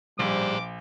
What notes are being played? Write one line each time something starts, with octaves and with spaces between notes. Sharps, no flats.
A#1 G3 G#4 C5 D6